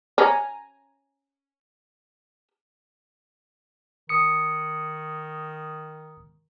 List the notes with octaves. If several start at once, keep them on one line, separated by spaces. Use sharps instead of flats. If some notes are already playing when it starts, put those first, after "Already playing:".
C#4 G#5 A#5
D#3 D#6 C#7